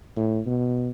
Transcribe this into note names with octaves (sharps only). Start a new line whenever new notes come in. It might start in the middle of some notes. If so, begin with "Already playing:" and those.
A2
B2